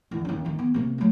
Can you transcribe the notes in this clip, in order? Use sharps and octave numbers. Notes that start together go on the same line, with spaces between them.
E2 D#3
D#2 C#4
G2 D#3
B3
C3 A#3
F#3 A3